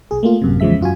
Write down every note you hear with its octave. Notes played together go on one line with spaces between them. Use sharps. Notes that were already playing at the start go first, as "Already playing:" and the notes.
B1 G#4
A3 A#3 F4
A1 F#2 C3
E2 C#3 F3 G#3 E5 B6
F#2 F4 F#4 G#5